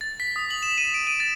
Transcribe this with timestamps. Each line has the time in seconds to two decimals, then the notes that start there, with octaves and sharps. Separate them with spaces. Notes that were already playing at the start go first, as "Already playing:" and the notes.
0.01 A6
0.20 B6
0.36 D#6
0.51 F#7
0.63 E7
0.78 D#7
0.94 D7
1.07 D#7
1.20 A6